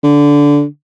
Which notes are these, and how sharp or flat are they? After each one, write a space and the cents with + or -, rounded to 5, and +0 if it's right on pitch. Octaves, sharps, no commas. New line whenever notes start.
D3 -15